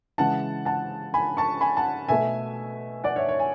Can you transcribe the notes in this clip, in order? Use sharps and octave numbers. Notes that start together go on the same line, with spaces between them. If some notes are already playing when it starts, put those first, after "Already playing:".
C#3 E3 G#3 F#5 A5
F#5 A5
G#5 B5
A5 C#6
G#5 B5
F#5 A5
B2 A3 E5 G#5
D5 F#5
C#5 E5
C#5
G#5